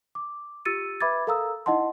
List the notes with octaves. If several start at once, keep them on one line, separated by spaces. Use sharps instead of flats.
D6
F4 G4 E6 A6 C#7 D#7
B4 E5 B5 D6 G#6 A6
A4 A#4 F5 A#5 D#6 E6
D#4 E4 D#5 F#5 A5 C6